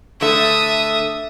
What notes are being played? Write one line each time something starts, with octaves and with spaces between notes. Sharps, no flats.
D3 A3 E5 D#6